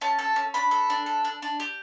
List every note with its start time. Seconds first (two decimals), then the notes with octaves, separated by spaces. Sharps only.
0.01 C#4 A5
0.19 A4
0.36 C#4
0.54 D4 B5
0.71 A4
0.90 D4
1.06 A4
1.24 D4
1.42 D4
1.60 G4